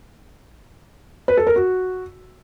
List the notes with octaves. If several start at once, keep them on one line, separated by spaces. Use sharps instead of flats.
B4
A4
A#4
F#4